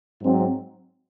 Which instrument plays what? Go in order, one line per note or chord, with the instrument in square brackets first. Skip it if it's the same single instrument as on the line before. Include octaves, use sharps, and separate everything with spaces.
[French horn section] G#2 F#3 C4